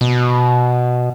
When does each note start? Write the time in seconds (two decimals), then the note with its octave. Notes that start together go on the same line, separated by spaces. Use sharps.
0.01 B2